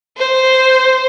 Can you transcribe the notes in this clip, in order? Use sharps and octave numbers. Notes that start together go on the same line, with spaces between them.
C5